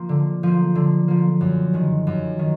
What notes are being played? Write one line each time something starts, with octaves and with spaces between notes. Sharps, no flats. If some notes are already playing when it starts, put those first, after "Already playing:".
Already playing: F3 A#3
D3
F3 A#3
D3
F3 A#3
F#2
D#3 G#3
F#2
D#3